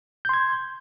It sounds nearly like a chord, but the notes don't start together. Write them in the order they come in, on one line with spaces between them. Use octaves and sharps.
G6 C6 G#6